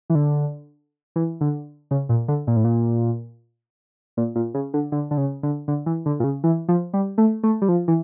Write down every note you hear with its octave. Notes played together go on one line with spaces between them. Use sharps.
E3
D3
E3
D3
C#3
A#2
D3
A#2
A2
A#2
A#2
A#2
C#3
D3
D3
D3
C#3
D3
D3
E3
D3
A#2
C#3
E3
F3
G3
A3
A3
G3
F3
E3